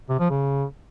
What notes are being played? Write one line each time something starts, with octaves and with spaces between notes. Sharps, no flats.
C3
F3
C#3